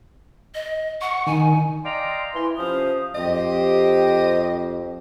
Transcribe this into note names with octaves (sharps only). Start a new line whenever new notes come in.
D#5
F#5 C#6
D#3 G#5
D5 D#5 F5 G5 A#5 C6
E3 E4 C6
C3 F3 C#4 C5 F5 D#6
F2 G4 C5 D#5